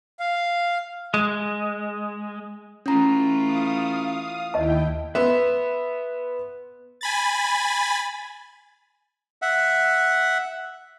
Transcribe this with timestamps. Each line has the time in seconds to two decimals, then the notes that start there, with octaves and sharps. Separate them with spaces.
0.20 F5
1.14 G#3
2.86 E3 A3 C#4 F4 A#5
3.44 F5 D#6
4.54 D#2 E4 D#5 G5 A5
5.15 B3 B4 E5 C6
7.01 G#5 B5 A6
9.42 E5 F#5